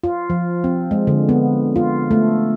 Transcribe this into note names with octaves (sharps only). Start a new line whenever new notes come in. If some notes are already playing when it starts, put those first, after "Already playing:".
F4
F3
C4
G#3
D3
B3
F4
A3